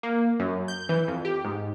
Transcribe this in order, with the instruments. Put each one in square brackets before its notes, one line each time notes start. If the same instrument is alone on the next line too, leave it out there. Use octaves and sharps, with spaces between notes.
[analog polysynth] A#3
F#2
G6
E3
F2
G4
G#2